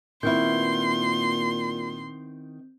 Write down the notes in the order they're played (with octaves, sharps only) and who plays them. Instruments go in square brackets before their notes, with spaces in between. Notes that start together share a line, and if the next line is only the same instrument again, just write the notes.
[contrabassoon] A#2 [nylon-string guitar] D#3 B3 E4 [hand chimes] C4 G6 [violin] C6